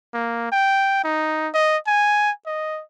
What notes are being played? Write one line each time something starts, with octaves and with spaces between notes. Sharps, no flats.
A#3
G5
D#4
D#5
G#5
D#5